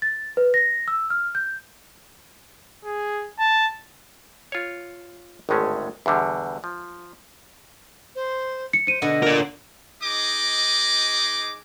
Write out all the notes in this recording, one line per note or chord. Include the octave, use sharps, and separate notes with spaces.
A6
B4
A#6
E6
F6
G6
G#4
A5
F4 C#5
G#1 D2 A2 G#3 A3 C#4
E2 B2 D3 G3
F3
C5
C#7
C5 C#7 D#7
B2 D3 D#5 F#5
A#4 D5
D#4 G#4 D#5 D6